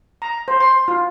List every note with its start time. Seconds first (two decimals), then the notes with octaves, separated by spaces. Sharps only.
0.22 A#5
0.48 C5
0.60 C6
0.88 F4